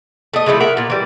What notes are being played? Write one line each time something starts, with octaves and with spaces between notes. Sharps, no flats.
A3 D#5
C#3 F3 A3 E4
A#4 E5 F#5
A#2 F4
E3 G3